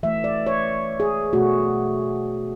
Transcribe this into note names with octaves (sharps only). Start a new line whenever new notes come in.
E3 A3 E5
D5
C#5
G#4
B2 A3 F#4